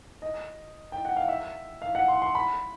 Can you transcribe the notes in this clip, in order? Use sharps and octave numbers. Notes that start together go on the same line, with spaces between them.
D#5
G5
F#5
F5
E5
F5
F#5
C6
C6
B5